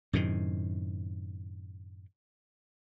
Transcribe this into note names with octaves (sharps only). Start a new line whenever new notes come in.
F#2 A2 C3 D#3